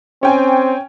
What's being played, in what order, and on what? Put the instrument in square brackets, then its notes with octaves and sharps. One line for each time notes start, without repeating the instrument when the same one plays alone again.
[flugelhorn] C4 [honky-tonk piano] C#4 G5 G#5